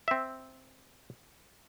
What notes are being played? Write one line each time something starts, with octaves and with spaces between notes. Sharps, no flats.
C4 E5